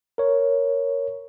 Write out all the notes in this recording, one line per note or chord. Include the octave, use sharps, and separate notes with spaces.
A#4 C#5